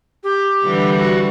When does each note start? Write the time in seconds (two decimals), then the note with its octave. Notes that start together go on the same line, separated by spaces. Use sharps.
0.24 G4
0.65 D3 E3 G3
0.98 F#4